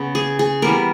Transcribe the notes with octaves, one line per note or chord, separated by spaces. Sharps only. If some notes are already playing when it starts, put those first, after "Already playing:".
Already playing: C#3 B3
G#4
G#4
E3 G3 B3 A#4